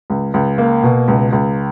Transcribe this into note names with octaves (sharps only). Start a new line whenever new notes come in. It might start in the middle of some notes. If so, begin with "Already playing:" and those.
C#2
C#2
A#3
B2
C#2
C#2